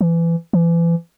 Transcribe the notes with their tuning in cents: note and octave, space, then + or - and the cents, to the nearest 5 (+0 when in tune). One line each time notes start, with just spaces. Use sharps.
E3 +25
E3 +35